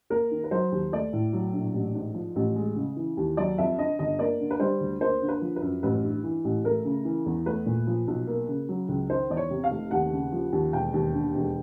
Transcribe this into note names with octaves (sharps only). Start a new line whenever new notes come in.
A#3 A#4
D#3
B4
F#3 C5
D#2
A3 D5
A2
F#3
A#1
A1
G#2
F3
A1
G#3
C#3
E3
D#2
F#3 D5
F2 E5
D3 D#5
G1 D#5
A#3 D5
D3
B4
G3 C5
D2
A#3 C5
D3
B4
F3
B4
F#2
A1 B4
G2
E3
A1
A3 A#4
C#3
E3
E2
A3 B4
A#2
F3
B1
A#3
C#3
F#3
C#2
D#3 C5
E2 D5
C#5
C3
F5
F1
D#2 F#5
C#3
F3
D#2
E1 G5
D#2
D3
E1